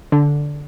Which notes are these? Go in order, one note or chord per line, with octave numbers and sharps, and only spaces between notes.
D3